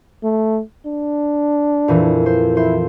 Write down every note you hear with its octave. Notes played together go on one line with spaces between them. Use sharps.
A3
D4
F2 A#2 E3
C5
E4 C5